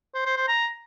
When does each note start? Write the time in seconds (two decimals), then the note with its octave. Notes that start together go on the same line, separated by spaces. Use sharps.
0.14 C5
0.25 C5
0.37 C5
0.48 A#5